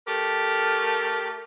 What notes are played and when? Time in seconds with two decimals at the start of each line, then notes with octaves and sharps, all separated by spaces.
0.07 A3 G4 A#4